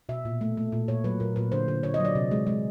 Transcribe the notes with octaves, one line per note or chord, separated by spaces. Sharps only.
B2 E5
A#2
A3
A3
A#2
A#2 C#5
F#3 B4
A#2 A#4
A#2 B4
D3 C5
D3
D3 C#5
D#5
F#3
D5
C3
G#3
G#3